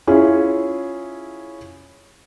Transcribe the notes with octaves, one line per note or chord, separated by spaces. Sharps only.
C#4 E4 F4 G#4